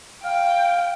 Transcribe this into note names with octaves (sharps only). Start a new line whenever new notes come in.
F5 G5